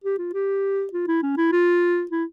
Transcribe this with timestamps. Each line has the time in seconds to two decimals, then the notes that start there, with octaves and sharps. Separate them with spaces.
0.04 G4
0.18 F4
0.33 G4
0.93 F4
1.08 E4
1.22 C#4
1.37 E4
1.52 F4
2.11 E4